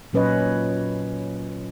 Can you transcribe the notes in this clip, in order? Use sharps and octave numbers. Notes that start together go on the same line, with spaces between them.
A#2 F#3 C#4 B4 C#5 D#5